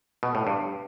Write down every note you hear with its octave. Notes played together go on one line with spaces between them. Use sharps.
B2
A2
G2